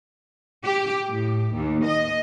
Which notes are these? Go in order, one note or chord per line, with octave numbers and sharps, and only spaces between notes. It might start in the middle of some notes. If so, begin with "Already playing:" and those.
G4
A2
D#2
D#5